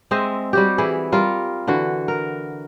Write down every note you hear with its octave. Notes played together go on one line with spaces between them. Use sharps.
G#3 C4 D#5 E5
G3 F#4 G4
E3 E4 G#4
G3 F4 A#4
D3 E3 F#4
A#4